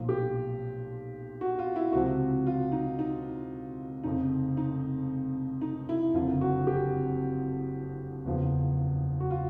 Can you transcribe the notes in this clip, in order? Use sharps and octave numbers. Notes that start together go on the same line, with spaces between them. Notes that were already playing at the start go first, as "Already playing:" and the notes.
Already playing: B1 A#2 F3
G4
F#4
F4
E4
C#2 C3 F3 F#4
F4
D#4
D#4
F1 F2 C#3 D#4
D#4
D#4
E4
F#1 F2 D3 F3 F4
F#4
G4
F#1 E2 C#3 F3
F#4
F4